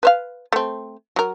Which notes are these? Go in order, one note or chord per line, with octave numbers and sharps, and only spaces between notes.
B4 C5 F5
A3 C4
F#3 A#4